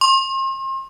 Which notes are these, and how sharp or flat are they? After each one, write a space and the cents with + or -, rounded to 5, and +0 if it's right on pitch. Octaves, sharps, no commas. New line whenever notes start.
C6 +40